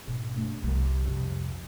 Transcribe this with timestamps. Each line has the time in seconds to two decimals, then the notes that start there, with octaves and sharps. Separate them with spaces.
0.07 G#2 B2
0.35 G2 A3
0.63 C2 F3
1.05 F2 C3